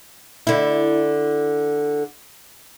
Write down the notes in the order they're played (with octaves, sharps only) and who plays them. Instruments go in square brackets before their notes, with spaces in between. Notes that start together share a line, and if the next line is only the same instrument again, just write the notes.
[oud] D3 E4